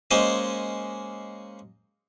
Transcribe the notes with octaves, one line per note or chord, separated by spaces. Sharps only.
G#3 A#3 C#4 C5 D#5